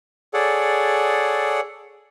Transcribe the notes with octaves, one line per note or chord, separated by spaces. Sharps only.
G#4 A4 C#5 D5 F#5